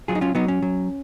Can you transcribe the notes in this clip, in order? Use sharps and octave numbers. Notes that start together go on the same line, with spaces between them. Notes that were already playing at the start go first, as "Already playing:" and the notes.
F#3 F4 G#4
D#4
C#4 F4
F#3 B3 D#4
C#4
F#3